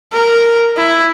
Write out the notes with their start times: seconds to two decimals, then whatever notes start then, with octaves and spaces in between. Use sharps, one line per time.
0.13 A#4
0.76 E4